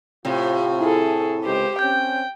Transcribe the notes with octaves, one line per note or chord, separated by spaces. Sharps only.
A2 C3 F4
E4 G#4 A4
C#2 G4 C5
C4 C#4 G5 G6